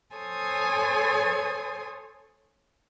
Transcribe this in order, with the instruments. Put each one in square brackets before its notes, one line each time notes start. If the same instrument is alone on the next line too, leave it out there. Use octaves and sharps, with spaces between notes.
[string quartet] A4 C5 C#5 G#5 D#6